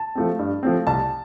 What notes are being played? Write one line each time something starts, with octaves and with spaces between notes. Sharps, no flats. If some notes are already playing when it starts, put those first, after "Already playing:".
Already playing: A5
F3 A3 C4
G2
F3 A3 C4
C2 A5